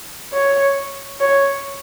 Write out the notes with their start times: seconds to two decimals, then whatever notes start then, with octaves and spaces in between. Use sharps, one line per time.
0.33 C#5
1.20 C#5